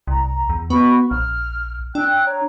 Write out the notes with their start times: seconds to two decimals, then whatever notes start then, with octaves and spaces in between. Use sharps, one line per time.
0.07 C2 A#5
0.49 E2
0.70 B3 F#4 B5 C#6
1.11 A#1 F6
1.95 D4 G5 E6 F#6
2.26 C#5 A#5